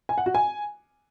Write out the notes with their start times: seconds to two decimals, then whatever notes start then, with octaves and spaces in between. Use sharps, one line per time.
0.09 G#5
0.18 F#5
0.26 F#4
0.35 G#5